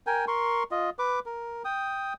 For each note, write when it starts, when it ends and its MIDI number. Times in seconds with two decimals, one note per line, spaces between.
0.07 0.25 70
0.07 0.25 79
0.07 0.25 80
0.28 0.63 70
0.28 0.63 84
0.28 0.63 85
0.71 0.90 65
0.71 0.90 75
0.99 1.19 71
0.99 1.19 86
1.26 1.63 70
1.65 2.13 79
1.65 2.13 87